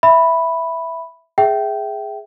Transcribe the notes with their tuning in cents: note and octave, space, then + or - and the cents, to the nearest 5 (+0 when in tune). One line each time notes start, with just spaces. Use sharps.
E5 +0 B5 +0
G#4 +0 E5 +0 G5 -15